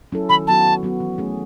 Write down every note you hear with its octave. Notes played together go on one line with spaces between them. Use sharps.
F#3 C#4 E4 A4
D#3 B5
F#3 B3 F#4 A5
D#3
F#3 B3 F#4
E3
A3 C#4 G#4